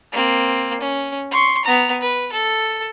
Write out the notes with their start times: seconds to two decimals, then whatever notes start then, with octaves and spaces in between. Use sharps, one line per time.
0.12 A#3 C4
0.81 C#4
1.31 C6 C#6
1.65 B3 A#5
2.01 B4
2.32 A4